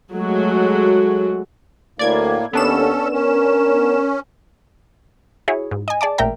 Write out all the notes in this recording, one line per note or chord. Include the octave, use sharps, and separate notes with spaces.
F#3 G#3 A3 F#4
D2 A2 A#3 D5 G#6
D#2 B3 C#4 D4 A4 E7
C#4 A#4
E4 F#4 G#4 C#5
G#2
D#5 G#5
G#4 D5 A5 D6
A1 A#2 A#4 E5 G5 A#5